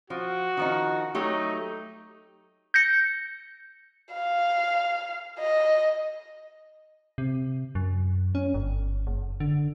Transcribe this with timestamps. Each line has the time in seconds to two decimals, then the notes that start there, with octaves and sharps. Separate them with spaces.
0.10 F3 F#4
0.57 D#3 F3 D#4
1.15 F#3 A3 D#4 G4
2.74 G6 A#6 C#7
4.14 F5
5.40 D#5
7.18 C3
7.75 F#2
8.35 C#4
8.54 G1
9.07 F#1
9.40 D3